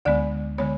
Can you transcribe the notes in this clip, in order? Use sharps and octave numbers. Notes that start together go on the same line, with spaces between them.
D2 D3 G#3 B3 D5
D3 G#3 B3 C#5